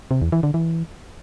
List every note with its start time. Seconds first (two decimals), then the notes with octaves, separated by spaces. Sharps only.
0.11 C3
0.22 E2
0.32 E3
0.43 D3
0.54 E3